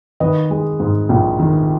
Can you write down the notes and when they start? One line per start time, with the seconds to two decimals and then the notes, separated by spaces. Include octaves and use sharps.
0.20 D#3 B4 D#5
0.50 G#3
0.80 G#2
1.09 A#1
1.39 D#3